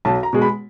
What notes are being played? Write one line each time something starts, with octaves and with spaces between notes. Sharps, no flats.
B1 A5
A#5
B2 G#3
B5